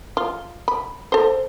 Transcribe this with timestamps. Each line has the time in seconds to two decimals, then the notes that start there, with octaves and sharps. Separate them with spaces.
0.17 F4
0.68 B5
1.12 A4 C5